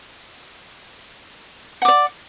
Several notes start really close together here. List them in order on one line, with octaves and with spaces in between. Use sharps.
F#5 D6 D5